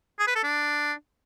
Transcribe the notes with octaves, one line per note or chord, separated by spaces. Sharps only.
G#4
B4
A4
D4